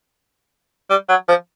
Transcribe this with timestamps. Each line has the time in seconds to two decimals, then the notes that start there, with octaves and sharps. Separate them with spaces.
0.90 G3
1.09 F#3
1.28 F3